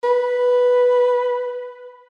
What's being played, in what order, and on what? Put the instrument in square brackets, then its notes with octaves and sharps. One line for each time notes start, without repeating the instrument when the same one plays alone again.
[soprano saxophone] B4